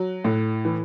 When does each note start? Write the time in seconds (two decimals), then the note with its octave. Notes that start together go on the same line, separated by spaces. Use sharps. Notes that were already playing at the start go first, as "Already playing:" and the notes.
Already playing: F#3
0.24 A2
0.65 E3